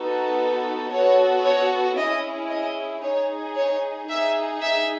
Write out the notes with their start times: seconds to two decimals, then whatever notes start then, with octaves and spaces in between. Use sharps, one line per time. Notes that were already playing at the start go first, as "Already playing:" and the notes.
Already playing: B3 D#4 F#4 A4
0.91 B3 F#4 A4 C#5
1.45 C#5
1.97 C#4 E4 G#4 D#5
2.50 D#5
3.03 D#4 G#4 C#5
3.56 C#5
4.09 D#4 G#4 E5
4.62 E5